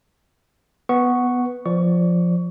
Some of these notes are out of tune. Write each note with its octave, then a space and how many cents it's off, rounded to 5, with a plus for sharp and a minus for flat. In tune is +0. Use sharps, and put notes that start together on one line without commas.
B3 +0 C#6 +0
F3 +0 D5 -5 C#6 +20